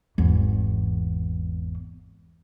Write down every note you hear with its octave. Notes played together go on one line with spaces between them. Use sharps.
G#1 E2